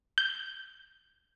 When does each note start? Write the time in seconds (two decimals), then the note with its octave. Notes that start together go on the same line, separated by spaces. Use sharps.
0.18 G6